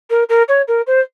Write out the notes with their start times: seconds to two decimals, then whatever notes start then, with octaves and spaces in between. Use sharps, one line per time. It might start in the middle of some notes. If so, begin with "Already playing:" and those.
0.10 A#4
0.29 A#4
0.48 C#5
0.68 A#4
0.87 C5